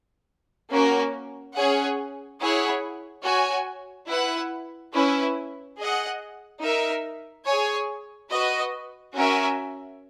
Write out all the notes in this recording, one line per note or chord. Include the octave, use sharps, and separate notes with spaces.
A#3 C#4 F#4 A#4
C#4 G#4 C#5 F#5
E4 G#4 C#5 F#5
F#4 C#5 G#5
E4 B4 F#5
C#4 E4 B4
G#4 D#5 F#5
D#4 A#4 E5
G#4 C#5 G#5
F#4 B4 D#5
C#4 F#4 A#4 E5 G#5